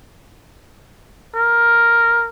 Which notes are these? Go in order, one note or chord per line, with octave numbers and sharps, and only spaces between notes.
A#4